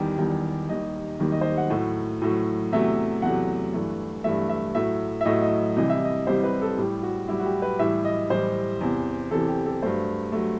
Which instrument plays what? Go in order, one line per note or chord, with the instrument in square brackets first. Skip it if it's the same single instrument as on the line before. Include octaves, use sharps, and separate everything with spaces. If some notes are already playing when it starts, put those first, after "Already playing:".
Already playing: [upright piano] E2 D#3 G3 G4
E2 D#3 G3
D#2 D#3 G3 D#5
D#2 D#3 G3
D#5
C5
D#5
F#5
A2 F#3 A3
A2 F#3 A3
E2 C3 F#3 A3 E5
E2 C3 F#3 A3 F#5
G2 E3 A3
G2 E3 A3 E5
E5
A2 F#3 A3 E5
E5
A2 F#3 A3 D#5
D#5
C2 C3 E3 G3 D#5
E5
D#5
C2 C3 E3 G3 C5
B4
A4
A2 G3 G4
F#4
A2 G3 E4
F#4
G4
B4
A2 E3 G3 E5
D#5
A2 E3 G3 C5
E2 C3 E3
E2 C3 E3 A4
G4
A4
G2 F#3 A3 C5
F#3 A3